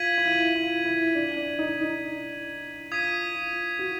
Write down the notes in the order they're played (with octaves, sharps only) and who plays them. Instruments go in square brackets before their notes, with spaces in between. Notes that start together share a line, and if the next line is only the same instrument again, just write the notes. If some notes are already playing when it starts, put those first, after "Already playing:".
Already playing: [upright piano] F4 [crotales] G#6 B6 D#7 F#7
[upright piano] F4
E4
F4
E4
D4
D4
D#4
D#4
[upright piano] F4 [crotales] D#6 G#6 B6 D#7
[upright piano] F4
F#4